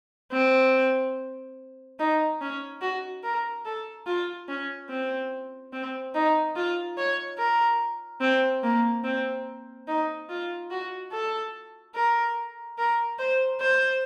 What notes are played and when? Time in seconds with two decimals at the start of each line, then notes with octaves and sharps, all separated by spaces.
0.32 C4
1.99 D#4
2.41 C#4
2.81 F#4
3.24 A#4
3.66 A4
4.07 F4
4.48 C#4
4.89 C4
5.73 C4
6.15 D#4
6.56 F4
6.97 C#5
7.38 A#4
8.21 C4
8.63 A#3
9.04 C4
9.88 D#4
10.30 F4
10.71 F#4
11.12 A4
11.95 A#4
12.78 A#4
13.19 C5
13.61 C5